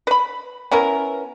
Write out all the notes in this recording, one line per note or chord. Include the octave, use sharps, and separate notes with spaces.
B4 B5
B3 C#4 E4 A#4